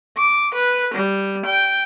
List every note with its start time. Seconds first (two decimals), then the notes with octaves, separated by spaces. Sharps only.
0.17 D6
0.55 B4
0.94 G3
1.46 G5